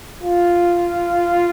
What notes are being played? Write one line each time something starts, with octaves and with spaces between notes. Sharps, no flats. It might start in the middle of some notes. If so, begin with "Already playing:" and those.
F4